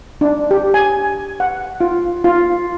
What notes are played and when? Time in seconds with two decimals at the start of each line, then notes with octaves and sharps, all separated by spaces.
0.21 D4
0.51 G4
0.74 G#5
1.40 F#5
1.81 F4
2.24 F4